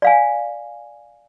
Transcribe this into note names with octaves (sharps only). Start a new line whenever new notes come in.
D5 F5 G#5